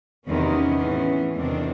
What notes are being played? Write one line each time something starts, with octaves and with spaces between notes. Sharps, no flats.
E2 C3 D#3 B3 C#4
A2 E3
E2 C3 D#3 C4 D4